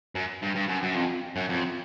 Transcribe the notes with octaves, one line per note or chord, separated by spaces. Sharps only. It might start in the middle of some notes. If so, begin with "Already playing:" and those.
F#2
G2
G2
F#2
F#2
F2
F#2
F2